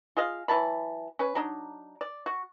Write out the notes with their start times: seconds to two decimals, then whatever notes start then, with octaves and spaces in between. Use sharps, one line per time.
0.17 F4 G#4 D#5 F5
0.48 E3 F#3 A5 B5
1.19 C#4 B4
1.35 F#3 D4 D#4
2.01 D5
2.26 F#4